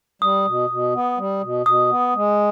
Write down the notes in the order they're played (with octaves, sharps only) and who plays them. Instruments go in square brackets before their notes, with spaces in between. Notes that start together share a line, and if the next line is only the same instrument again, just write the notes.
[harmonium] G3 [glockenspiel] D#6
[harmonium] B2
B2
B3
G3
B2
[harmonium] B2 [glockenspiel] D#6
[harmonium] B3
G#3